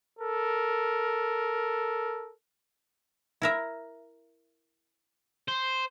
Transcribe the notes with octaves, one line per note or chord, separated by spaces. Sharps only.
A4 A#4
E4 A#4 E5
C5